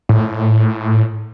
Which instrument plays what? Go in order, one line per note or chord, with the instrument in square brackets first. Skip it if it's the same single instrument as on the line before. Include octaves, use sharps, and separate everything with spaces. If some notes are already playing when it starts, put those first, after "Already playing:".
[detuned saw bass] A2